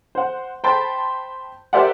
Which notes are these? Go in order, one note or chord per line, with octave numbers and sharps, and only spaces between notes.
C5 F#5
C5 G5 A5 B5 C6 A6
G4 A#4 C5 D5 E5 F#5